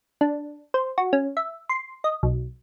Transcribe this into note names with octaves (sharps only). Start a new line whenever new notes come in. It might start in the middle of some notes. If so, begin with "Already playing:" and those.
D4
C5
F#4
C#4
E5
C6
D#5
B1